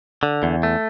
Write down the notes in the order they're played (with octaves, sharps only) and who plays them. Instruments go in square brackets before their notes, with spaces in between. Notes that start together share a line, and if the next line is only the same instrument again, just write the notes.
[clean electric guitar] D3
E2
A3